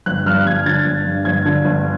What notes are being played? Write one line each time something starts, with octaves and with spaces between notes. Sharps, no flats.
G1 F#6
G2 F6
G1 G#6
D3 A6
G1
G2
G1 G#6
D3
G1